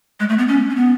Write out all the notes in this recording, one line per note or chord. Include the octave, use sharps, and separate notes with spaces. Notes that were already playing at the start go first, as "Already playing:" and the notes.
G#3
A3
B3
C#4
C#4
B3